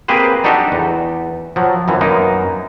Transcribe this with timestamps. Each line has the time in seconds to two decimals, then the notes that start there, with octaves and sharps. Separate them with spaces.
0.08 A#3 C4 G4 G#4 B4 C5
0.44 D4 D#4 F#4 G4 A4
0.72 E2
1.56 F3 F#3
1.88 F#2 E3 F3
2.01 F#2 A#3 B3 D#4